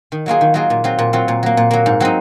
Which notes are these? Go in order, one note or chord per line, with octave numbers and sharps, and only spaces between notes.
D#3
F#3 A#3 F4 G#4
D#3
F#3 A#3 F4 G#4
A#2
F#3 C4 F4
A#2
F#3 C4 F4
A#2
F#3 A#3
A#2
F#3 A#3
G#2
F#3 C4 D#4